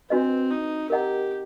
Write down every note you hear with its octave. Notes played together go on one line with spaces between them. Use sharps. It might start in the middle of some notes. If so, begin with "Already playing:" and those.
C4 D4 F#4 B4 D#5
D#4
G4 A#4 D#5 F#5 A#5